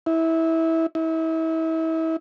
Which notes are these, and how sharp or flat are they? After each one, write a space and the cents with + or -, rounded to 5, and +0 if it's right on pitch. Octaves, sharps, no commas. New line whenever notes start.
E4 -20
E4 -35